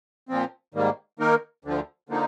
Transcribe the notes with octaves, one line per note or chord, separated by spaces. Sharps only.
A#2 F3 C4
G#2 D#3 G3 A#3
D#3 A#3 D#4 A#4
D2 D3 F3
D3 F3 A#3 D#4